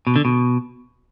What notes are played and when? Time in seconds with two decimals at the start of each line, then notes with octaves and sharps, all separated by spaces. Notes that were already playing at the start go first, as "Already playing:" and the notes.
0.07 B2
0.16 D3
0.25 B2